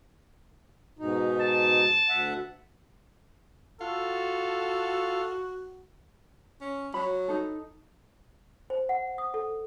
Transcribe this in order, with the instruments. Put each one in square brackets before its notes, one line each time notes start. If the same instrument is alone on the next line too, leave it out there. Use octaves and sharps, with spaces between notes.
[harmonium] G#2 B2 D#4
[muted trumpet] A5
[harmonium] D2 E5 F#5
[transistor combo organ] F4 [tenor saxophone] F#4 [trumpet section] A4
[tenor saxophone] C#4
[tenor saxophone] F#3 [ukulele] B5
[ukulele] D#4 A4
[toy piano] C5
F#5
D#6
A4